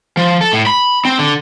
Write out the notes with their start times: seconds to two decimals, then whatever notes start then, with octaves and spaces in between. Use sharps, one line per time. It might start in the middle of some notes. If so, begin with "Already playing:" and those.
0.17 F3
0.41 A4
0.53 A2
0.67 B5
1.05 C4
1.19 D3